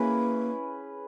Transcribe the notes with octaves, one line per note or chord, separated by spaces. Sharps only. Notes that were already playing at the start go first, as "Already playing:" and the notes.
Already playing: A#3 C#4 E4 G#4 B4